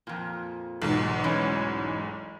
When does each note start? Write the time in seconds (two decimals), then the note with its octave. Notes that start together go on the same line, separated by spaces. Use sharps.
0.07 F2 A#2
0.82 B1 E2 G#2
1.24 A2 E3 C#4